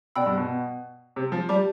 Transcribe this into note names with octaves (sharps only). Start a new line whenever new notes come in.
B2 D5 G5 B5 E6
G2
B2
C3
F3
G3 G4 D5 A5 D6